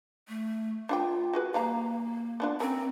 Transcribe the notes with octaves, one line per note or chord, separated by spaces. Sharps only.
A3
D4 F4 F#5 G5
F#4 G#4 B4
G3 A#3 F5 A#5
B3 D4 F4
C4 C#4 A#4